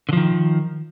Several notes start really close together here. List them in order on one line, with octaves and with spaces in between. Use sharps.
D3 F3 D#3